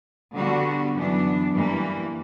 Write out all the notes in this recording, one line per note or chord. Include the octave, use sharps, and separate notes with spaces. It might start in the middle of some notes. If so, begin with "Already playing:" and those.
D3 G3 B3 F#4
F#2 E3 B3 D4
G2 E3 G3 A#3